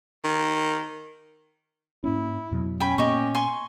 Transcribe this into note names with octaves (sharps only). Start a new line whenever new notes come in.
D#3
G#2 A#3 C#4 E4
F2 B2 F#3
C#4 G5 G#5 B5
A#2 A#3 B3 G4 D#5 C#6
G#5 C6 C#6